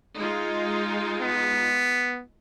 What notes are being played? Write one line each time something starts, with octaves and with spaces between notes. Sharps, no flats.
G#3 D#4 F4
B3